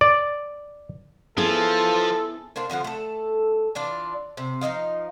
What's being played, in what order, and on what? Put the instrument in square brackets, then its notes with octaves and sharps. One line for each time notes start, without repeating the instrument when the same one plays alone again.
[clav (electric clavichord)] D5
[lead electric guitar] F3 [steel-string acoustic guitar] B3 E4 G#4 [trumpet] A4
[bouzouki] A#3 D4 C5 F5
D3 F3 F4 F#5
A3 A4
E3 D4 F4 D5
C3
F3 D#4 D#5 F5